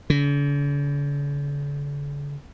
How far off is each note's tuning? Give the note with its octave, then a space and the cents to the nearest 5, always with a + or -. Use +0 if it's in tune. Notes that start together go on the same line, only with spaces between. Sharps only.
D3 -45